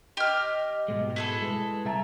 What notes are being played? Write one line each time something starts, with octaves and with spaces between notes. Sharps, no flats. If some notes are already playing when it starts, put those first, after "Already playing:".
G4 D#5 F6
G#2 B2 G#3
E4 G#4 A4
G#3 B4
C2 E5 A5 A#5